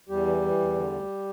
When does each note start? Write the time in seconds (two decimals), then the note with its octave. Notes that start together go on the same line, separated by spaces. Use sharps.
0.09 E2 G3 G4
0.26 E3
0.42 E3
0.59 E2
0.76 D3
0.92 D2